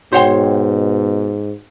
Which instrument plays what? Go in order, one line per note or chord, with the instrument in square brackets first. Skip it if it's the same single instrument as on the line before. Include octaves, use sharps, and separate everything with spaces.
[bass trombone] G#2 [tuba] B2 [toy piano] F#4 F#5 G5 [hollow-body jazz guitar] C5 C#5 C6